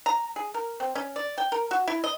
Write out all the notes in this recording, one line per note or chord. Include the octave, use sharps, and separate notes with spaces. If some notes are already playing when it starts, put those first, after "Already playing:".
A#5
G#4
A#4
C4
C#4
D5
G5
A#4
F#4
E4
D#5